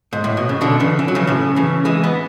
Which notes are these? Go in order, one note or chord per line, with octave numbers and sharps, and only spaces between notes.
G#2
A2
B2
C#3
B2 D3
C#3 E3
E3
F#3
C#3 E3
A2 C#3
C#3 E3
E3 G#3
B3